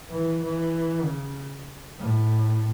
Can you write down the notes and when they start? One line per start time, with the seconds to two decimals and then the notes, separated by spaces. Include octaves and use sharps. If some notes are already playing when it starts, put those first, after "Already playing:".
0.10 E3
0.42 E3
1.03 C#3
1.98 A2